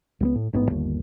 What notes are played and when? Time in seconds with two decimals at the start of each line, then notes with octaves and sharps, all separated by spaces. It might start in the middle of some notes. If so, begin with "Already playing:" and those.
0.20 C#2 G3 B3
0.35 A2
0.53 A1 G#2 B2 B3
0.70 G1 D#2